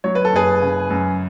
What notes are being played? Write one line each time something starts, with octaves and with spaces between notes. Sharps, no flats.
F#3 C#5
B4
A4
F#1 G#4 B4
C#3
F#2